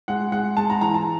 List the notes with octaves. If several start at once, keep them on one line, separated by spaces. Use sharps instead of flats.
G#3 F#5
G#3 F#5
G#3 A5
A#5
E3 A#5
A5